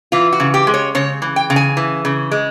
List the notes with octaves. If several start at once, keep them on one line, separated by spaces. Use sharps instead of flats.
E3 F4
F#4
C#3
G4
G#3
C#5
C#3 C#5
E3
G5
C#3
G#5
E3
C#3
G#3